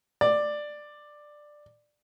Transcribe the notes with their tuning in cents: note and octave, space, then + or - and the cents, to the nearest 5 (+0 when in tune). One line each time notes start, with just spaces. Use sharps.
D5 +10